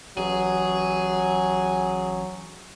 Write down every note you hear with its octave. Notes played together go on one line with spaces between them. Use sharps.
A1 F#3 G#4